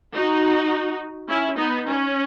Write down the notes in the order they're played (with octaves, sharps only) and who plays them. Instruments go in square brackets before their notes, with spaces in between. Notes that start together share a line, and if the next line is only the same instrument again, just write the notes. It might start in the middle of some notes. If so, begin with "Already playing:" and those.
[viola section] D#4 F#4
C#4 E4
B3 D#4
C#4